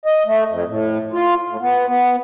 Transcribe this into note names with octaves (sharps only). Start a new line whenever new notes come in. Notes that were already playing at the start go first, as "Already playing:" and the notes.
D#5
A3
F2
A2
F4
A2
B3
B3